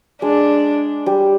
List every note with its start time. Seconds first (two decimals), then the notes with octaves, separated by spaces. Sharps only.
0.22 G#3 D4
1.06 G3